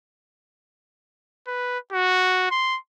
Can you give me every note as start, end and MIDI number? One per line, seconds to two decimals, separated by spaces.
1.47 1.78 71
1.92 2.47 66
2.51 2.78 84